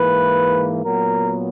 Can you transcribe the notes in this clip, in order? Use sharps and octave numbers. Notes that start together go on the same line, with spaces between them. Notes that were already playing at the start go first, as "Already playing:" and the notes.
Already playing: G#2 E3 A#3 B4
A#2 F#3 B3 A#4